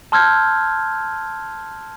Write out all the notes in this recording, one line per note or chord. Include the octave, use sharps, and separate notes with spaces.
A5 C6 E6 F6 G6 G#6